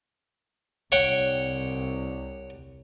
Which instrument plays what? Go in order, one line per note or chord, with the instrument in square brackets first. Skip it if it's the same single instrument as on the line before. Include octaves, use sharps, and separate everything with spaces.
[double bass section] C2 [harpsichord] C#5 F#5 G5